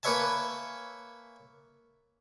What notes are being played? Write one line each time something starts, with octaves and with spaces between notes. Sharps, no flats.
A#3 B4 C#5 E5 G#5 A5